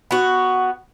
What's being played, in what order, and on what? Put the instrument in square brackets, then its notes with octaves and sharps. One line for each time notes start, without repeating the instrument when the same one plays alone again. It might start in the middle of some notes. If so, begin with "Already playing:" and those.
[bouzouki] B3 F#4